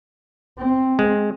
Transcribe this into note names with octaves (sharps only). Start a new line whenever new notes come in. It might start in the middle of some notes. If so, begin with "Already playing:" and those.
C4
G#3